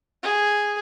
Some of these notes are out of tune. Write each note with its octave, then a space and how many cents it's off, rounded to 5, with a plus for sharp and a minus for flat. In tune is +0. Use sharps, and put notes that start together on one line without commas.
G#4 -5